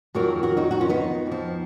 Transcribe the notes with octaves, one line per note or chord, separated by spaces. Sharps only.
F2 D#3 F#3 F#4 A#4
F#4 A#4
D#4 F#4
D#4 F#4
C#4 F4
B3 D#4
F2 F3